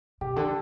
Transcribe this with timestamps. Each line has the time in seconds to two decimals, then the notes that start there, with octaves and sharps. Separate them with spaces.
0.21 B2 G4
0.36 D3 A4